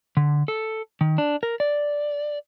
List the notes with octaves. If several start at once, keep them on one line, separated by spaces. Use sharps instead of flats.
D3
A4
D#3
D4
A#4
D5